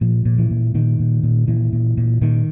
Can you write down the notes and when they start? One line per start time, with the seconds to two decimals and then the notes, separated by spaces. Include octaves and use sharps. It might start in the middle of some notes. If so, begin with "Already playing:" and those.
0.01 A#2 F3
0.25 A#2
0.38 E3
0.51 A#2
0.74 A#2 D#3
1.00 A#2
1.23 A#2
1.48 A#2 E3
1.73 A#2
1.97 A#2
2.22 A#2 D#3